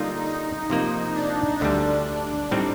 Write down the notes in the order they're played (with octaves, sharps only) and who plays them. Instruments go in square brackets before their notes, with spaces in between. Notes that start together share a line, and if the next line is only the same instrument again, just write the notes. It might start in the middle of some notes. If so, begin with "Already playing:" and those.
Already playing: [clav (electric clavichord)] D3 G3 A#3 F4 [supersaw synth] D#4
[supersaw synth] D#4
[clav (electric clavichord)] C3 F3 A#3
[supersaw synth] D4
[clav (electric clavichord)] D2 D3 G3 [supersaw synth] D4
[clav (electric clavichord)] A2 G3 C4 D#4